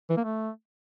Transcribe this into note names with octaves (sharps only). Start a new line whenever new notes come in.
E3
A#3
A3